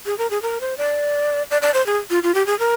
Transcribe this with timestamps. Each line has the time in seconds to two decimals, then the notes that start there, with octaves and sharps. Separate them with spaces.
0.06 G#4
0.18 A#4
0.30 G#4
0.42 A#4
0.61 C5
0.78 D5
1.51 D5
1.62 D5
1.74 C5
1.86 G#4
2.10 F4
2.23 F4
2.34 G4
2.46 G#4
2.59 A#4